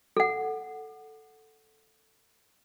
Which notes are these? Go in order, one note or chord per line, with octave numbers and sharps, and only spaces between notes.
A4 F#5